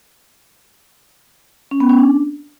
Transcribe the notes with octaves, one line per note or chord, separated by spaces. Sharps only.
C#4
B3
C#4
D4